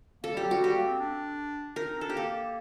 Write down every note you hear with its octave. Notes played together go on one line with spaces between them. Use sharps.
A#3 A4
G3 G4
F#3
G3 F#4
G3 G4
A#3
C4
D4
D#4 A#4
D#4
C4
D4 A4
G4
A#3 A4